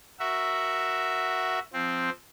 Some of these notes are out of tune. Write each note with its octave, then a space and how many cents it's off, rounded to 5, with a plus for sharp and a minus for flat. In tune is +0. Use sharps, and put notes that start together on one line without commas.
F#4 +0 A#4 +0 E5 +0
F3 +0 C4 +0